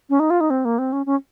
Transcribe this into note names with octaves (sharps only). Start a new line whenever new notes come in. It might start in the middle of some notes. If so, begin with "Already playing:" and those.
C#4
D#4
F4
D#4
C4
A#3
C4
C#4
C#4